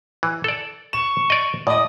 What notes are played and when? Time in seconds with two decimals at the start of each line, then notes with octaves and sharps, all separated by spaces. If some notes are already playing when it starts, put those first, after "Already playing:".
0.23 E3
0.44 A4 D5
0.93 C#6 E7
1.30 D5 D#5
1.67 A2 D5 D#5 D#6